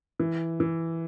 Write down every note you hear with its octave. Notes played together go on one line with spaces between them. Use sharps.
E3
E3